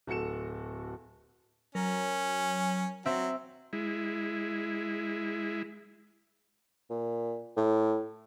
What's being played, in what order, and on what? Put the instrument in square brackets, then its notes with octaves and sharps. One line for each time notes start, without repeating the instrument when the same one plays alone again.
[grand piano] D1 F#4 A4 C#7 E7
[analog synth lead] F#3 [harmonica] C#4 [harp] A#4
[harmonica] F#3 [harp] C4 E5
[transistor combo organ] G#3 E4
[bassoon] A#2
A2